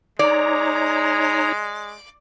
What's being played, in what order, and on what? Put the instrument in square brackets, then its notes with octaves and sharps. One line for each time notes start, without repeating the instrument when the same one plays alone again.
[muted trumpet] G#3 [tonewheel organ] D#4 C#5 A#5 [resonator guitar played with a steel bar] D5